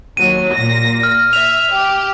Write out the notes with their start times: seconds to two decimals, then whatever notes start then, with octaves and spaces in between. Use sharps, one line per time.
0.17 D#2 F#3 D#7
0.55 A#2 A#6
1.03 F6
1.33 E5 F7
1.73 G4